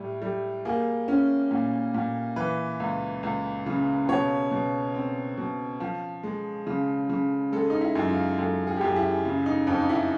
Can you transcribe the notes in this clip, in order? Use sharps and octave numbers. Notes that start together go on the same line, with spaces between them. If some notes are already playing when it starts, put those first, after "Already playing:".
Already playing: A2 G3
G3
A#3 G#4
C#4
A#2
A#2
E3 B4
C#2
C#2
C#3
B2 C#5
B2
C4
B2
F3
G#3
C#3
C#3
G#3 A4
D#4
E4
F#2
F4
F#2 A4
G#4
G4
F#2 G#4
E4
C#3
D#4
F2 D#4
D#4
E4